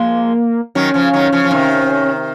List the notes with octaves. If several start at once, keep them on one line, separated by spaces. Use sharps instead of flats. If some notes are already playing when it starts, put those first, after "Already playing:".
Already playing: F3 G#3 A#3
D#3 F#3 C#4
C#3 F3
D#3 F#3
C#3 F3
F3
C3 D#3